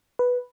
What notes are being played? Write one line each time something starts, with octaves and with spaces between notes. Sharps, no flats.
B4